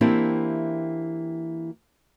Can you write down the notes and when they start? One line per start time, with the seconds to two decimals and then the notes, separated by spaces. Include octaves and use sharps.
0.01 E3 A#3 C4 D4 E4 G4